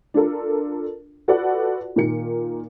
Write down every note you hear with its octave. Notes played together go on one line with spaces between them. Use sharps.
D4 F4 A4 A#4
F4 F#4 A4 B4 D5 F#5
A#2 D#3 A#4 C#7